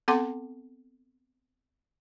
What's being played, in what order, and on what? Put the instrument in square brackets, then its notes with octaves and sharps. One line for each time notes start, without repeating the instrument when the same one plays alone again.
[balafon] B3 C4 A4 F#5 C6 D6